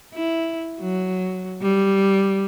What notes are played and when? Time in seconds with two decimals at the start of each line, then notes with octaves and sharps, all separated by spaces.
0.14 E4
0.80 F#3
1.62 G3